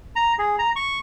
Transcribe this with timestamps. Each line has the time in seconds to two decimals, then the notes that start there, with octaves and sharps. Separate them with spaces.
0.16 A#5
0.39 G#4
0.59 A#5
0.76 C#6